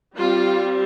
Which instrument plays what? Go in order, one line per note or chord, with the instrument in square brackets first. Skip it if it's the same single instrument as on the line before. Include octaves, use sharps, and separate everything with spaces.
[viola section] G3 C4 F4